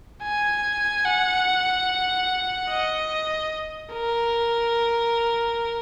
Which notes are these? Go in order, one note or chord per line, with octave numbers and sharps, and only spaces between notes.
G#5
F#5
D#5
A#4